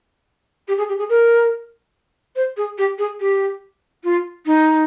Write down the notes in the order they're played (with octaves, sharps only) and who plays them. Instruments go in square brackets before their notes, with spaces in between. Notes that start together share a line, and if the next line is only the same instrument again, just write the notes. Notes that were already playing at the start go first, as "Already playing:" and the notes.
[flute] G4
G#4
G4
G#4
A#4
C5
G#4
G4
G#4
G4
F4
D#4